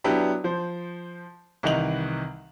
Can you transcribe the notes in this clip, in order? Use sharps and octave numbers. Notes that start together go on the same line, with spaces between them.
F#3 B3 D4 E4 G4
F3 C5
C2 D#3 E3 D#4 F7 F#7